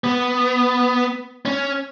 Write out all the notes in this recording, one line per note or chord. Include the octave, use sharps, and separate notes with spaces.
B3
C#4